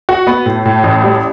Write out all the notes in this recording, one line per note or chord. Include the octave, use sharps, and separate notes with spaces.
F#4
B3
A2
A2
A1
G3